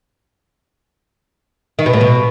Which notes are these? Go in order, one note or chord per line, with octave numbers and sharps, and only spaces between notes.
D#3
B2
A2
B2